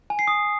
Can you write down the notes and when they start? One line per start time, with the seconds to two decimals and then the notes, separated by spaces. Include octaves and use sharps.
0.10 G#5
0.19 C7
0.28 D#6